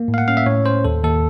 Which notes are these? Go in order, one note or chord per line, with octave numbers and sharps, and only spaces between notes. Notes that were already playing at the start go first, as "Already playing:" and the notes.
Already playing: A#3
A2
F5
F#5
C#4 F5
E5
A2 C#5
C#4 C5
D#2 A4
D#2 A4